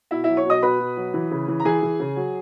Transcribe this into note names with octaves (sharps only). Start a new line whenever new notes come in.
B2 E4 E5
F#3 E4 E5
C#5 C#6
B2 D#5 D#6
B2 B4 B5
B2
F#3
E3
C#3
E3
A#5
E3 G#4 G#5
E3
C#3
F#3